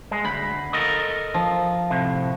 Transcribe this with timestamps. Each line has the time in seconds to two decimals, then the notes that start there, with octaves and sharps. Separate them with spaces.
0.11 G#3
0.25 D2 B5
0.73 A4 A#4 D#5
1.34 F3
1.90 A2 C3